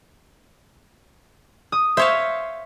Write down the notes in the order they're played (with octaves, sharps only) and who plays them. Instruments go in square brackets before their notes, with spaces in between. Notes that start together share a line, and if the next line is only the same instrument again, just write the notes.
[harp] D#6
[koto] C5 C#5 F5 [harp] E5